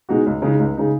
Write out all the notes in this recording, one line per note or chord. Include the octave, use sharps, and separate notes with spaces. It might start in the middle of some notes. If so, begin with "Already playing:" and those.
B2 G#3 D#4 F#4
C#2
C#3 G#3 D#4
C#2
C#3 G#3 D#4